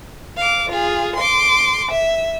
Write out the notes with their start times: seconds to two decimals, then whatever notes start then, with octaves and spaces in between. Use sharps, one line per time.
0.37 F5 D6
0.70 F4 G#4
1.16 C6 D6
1.91 E5